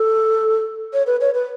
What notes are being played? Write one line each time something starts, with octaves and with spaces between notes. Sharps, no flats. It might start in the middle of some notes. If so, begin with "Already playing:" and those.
Already playing: A4
C#5
B4
C#5
B4